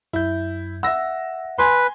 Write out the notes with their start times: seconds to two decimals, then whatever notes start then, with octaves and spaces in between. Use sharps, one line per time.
0.13 F#2 E4 G6
0.83 E5 F#5 E6 A#6
1.58 B4 G#5 C6